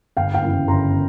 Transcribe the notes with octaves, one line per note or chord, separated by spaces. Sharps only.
G1 F5 G5
F5 G5
F#2 C#3 E3
G1 A#5 C6